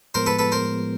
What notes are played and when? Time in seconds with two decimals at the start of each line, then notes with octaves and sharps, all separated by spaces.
0.14 A2 F3 G#3 B3 A#4 C5
0.26 A4 B4
0.39 A4 B4
0.52 A#4 C5